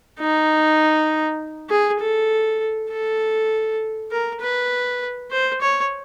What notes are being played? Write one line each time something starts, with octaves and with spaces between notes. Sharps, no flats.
D#4
G#4
A4
A4
A#4
B4
C5
C#5